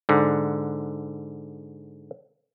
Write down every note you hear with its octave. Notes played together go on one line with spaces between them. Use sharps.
G#2 D3